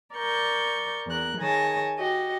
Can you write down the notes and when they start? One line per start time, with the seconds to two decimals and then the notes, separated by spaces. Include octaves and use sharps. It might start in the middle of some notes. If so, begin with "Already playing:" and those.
0.14 A#4 D5 C#6 G6
1.06 E2 A#4 F#6
1.38 D#3 G#4 C#5 G#5 A5 A#6
1.99 F#4 G4 D#5